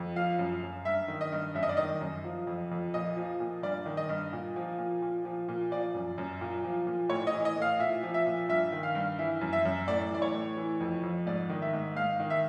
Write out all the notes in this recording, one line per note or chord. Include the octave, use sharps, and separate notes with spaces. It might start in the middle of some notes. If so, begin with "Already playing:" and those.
Already playing: F2
F3 F5
F#2
F#2
G2 E5
D#3
D#5
G2
F#2 E5
D#5
D5
D#3 D#5
F#2
F3
F2
F2
A#2 D#5
F3
A#2
G2 D5
D#3
D#5
G2
A#2
F3
A#2
A#2
F3
A#2
F3 D5
F#2
F#2
A#2
F3
A#2
A2 C#5
D#5
E3
D#5
A2 F5
A#2 E5
F3
E5
A#2
G2 E5
D#3
F5
G2
E3 E5
F#2
E5
F#2
A2 D5
E3 D5
C#5
A2
E3
F2
F2
G#2 D5
D#3
E5
G#2
G#2 F5
D#3
E5